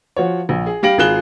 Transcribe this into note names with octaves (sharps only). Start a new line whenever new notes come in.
F3 F#4 C#5
A#1
G#4
G3 G4 F5 A#6 D7 F#7
G#1 F4 G#4 F#6 E7 G7